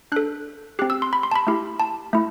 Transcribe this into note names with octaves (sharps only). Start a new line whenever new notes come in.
D4 A4 F#6
C4 G4 F#6
E6
C6
B5
C6
A5
B5
A3 E4 G4
A5
A3 E4